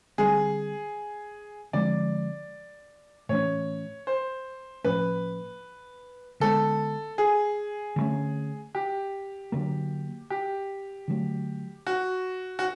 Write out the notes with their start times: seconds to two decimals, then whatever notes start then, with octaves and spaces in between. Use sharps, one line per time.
0.18 D3 G3 C4 G#4
1.73 D3 F3 G#3 C4 D5
3.29 A2 E3 A3 C#4 C#5
4.07 C5
4.84 A2 F3 A#3 C#4 B4
6.40 D3 F3 G#3 B3 A4
7.18 G#4
7.96 D3 F3 A3 C#4
8.75 G4
9.52 D3 F#3 A#3
10.30 G4
11.08 D3 F#3 A3
11.87 F#4
12.59 F#4